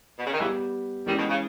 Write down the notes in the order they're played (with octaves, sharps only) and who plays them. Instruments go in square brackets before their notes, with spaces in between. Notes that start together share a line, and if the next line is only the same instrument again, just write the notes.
[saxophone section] B2
C#3
D#3
[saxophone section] C#3 E3 [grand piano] G3 B3 G4
[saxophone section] D#3 G3 [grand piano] E3 G#3 C#4 G#4
[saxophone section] B2 D#3
C#3